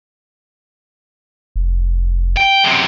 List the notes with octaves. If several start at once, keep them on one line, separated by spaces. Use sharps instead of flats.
F1
G5
F#2 C3